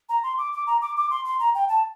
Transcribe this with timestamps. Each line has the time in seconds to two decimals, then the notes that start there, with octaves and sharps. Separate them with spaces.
0.09 A#5
0.23 C6
0.38 D6
0.52 D6
0.67 A#5
0.81 D6
0.97 D6
1.10 C6
1.25 C6
1.40 A#5
1.55 G5
1.68 A5